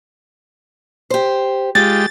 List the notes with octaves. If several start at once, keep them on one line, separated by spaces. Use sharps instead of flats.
G4 C5
G#3 F4 G4 A6